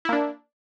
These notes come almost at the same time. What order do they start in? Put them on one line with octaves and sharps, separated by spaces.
E4 A#3 D4